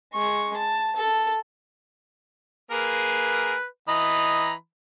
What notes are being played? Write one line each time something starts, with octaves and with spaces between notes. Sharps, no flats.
G#3 C#6
A5
A4
A#3 G#4 A#4 B4
E3 D#5 A#5 B5